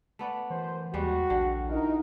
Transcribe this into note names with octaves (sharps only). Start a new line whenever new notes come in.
A3 B3 D5
F#2 E3 C5
D#2 G3 G#3 F#4
A#1 D3
D#4 E4 A#4